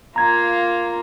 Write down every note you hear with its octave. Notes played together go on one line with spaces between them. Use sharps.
A#3 F4 A#5 G#6